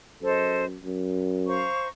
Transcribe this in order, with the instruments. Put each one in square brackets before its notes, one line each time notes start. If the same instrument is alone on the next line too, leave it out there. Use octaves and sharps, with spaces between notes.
[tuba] F#2 [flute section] A4 C5 D#5
[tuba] F#2
[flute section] C5 F5 A#5 C#6